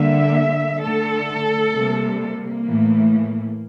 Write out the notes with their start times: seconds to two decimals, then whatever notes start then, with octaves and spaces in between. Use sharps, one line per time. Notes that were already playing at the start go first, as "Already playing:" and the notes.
Already playing: D3 G3 A#3 E5
0.80 D3 A3 A4
1.73 C3 G3 A#3
2.19 A#3
2.66 A2 E3 A3